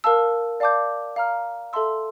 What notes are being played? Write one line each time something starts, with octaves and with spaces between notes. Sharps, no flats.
A#4 F5 A5 E6
D5 F5 A5 D6 G6
F5 A#5 F6
A4 E5 A5 C6 E6